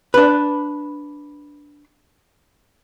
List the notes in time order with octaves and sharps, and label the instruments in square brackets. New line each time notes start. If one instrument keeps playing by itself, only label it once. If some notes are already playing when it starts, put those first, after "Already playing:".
[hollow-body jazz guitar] D4 B4